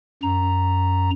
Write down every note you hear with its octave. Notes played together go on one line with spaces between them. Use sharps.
F#2 A#5